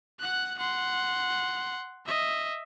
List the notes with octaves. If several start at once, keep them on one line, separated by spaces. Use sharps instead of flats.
F#5 F#6
F#5 C6
D#5 E5